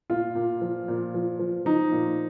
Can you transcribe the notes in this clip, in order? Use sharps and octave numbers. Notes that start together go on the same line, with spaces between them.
A#2 F4
A#2
F3
A#2
F3
F3
F3 D#4
A#2